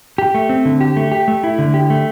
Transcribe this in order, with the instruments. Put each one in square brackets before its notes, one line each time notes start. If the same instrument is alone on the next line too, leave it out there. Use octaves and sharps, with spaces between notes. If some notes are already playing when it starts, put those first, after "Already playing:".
[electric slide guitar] G4
A3
C4
D3
G4
A3
G4
A3
E4
D3
G4
A3